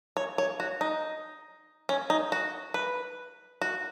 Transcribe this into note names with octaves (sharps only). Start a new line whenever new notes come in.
C#5
C#5
F#4
D#4
C#4
D#4
F#4
B4
F#4